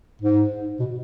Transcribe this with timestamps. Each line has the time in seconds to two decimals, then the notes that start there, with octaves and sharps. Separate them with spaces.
0.21 G#2
0.80 B2